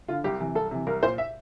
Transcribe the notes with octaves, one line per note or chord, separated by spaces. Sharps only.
D3 F4
C2 G4
C3 E3
C2 A4
C3 E3
C2 A#4
A#2 C5
E5